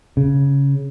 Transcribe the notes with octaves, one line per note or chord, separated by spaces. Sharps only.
C#3